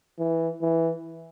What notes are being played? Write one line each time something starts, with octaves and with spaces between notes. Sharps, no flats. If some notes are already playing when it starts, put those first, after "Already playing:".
E3
E3